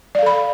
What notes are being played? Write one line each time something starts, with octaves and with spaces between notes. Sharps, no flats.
A4 D5 F5 B5